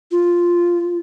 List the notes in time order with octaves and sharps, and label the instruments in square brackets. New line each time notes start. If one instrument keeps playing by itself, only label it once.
[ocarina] F4